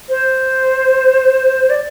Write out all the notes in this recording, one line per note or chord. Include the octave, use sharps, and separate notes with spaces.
C5
D5